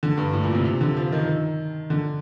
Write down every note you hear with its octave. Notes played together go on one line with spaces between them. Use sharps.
D3
G2
A2
A#2
C3
C3
D3
F3
D#3
D3